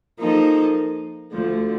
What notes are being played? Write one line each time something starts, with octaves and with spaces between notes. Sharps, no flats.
F3 A#3 D#4 A4
D2 D3 F3